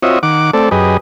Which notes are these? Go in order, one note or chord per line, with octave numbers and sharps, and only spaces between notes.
C4 F4 F#4 C#5 D#5 E5
D#3 F#5 D6
A3 C4 A4 D5
F#2 G4 G#4 B4 D#5